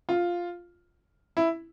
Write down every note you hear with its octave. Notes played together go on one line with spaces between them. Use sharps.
F4
E4